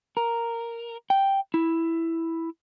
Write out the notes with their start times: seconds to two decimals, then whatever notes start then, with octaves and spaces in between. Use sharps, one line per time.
0.17 A#4
1.10 G5
1.54 E4